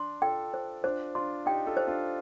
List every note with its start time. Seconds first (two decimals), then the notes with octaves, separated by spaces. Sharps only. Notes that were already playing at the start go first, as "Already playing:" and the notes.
Already playing: D4 C6
0.22 F4 A4 G5
0.54 C5
0.84 D4 F4 C5
1.15 D4 F4 C6
1.46 D#4 G4 G5
1.67 F4 A4
1.77 C5
1.88 D4 F4